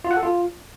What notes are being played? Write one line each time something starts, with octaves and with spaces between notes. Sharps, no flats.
F4
F#5
A4
F4